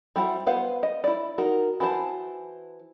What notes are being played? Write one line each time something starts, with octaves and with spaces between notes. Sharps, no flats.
G3 E4 F#4 C5
B3 B4 C5 F5 F#5
D#5
E4 D5
D#4 F#4 A#4
E3 F#4 C5 A5